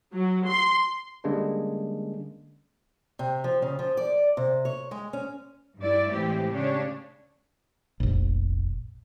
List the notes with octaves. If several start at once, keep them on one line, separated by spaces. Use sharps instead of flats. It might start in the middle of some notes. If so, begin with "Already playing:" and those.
F#3
C6
D3 G3 G#3 A#3 C#4 D4
C3
F3
C#3
F3
D5
C3
C#5
G#3
C#4
G2 G3 E4 D5
A2 E3 G#3 C4 E4 G4
C#3 D4 G4 C#5
F1 A#1